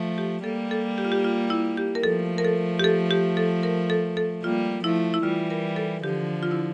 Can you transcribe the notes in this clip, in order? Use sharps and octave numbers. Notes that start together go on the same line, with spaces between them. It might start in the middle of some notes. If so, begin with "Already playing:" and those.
Already playing: F3 A3
G4
G3 A#3 A4
A4
G4
F4
G4
F4
E4
G4
A#4
F3 A3 A4
A#4
A4
G4
A4
G4
A4
A#4
A4
A4
G3 A#3 F4
F3 A3 E4
E4
E3 G3 F4
A#4
A4
D3 F3 G4
F4
E4